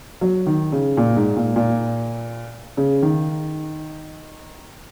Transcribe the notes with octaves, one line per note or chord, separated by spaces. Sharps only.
F#3
D#3
C#3
A#2
G#2
A#2
A#2
C#3
D#3